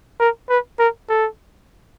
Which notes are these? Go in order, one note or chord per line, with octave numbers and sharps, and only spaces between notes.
A#4
B4
A#4
A4